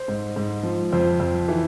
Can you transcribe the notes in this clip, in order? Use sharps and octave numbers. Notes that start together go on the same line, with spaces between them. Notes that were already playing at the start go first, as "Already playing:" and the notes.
Already playing: C5
G#2
G#2
F3
F2 C5
F2
E3